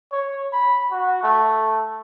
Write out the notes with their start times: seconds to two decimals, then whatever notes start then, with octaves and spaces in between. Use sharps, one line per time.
0.12 C#5
0.53 B5
0.91 F#4
1.23 A3